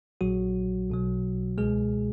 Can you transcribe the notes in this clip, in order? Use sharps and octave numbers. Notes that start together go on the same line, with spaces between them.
A#1 A#2 F#3 F#4
B1 B2 F#3
C#2 B2 G#3 G#4